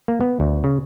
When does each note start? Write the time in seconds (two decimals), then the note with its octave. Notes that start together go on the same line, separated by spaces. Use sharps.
0.08 A#3
0.21 B3
0.40 D2
0.64 C#3